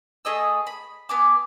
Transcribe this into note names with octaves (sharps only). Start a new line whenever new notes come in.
A3 G#4 D#5 E6
B5
B3 G#5 D6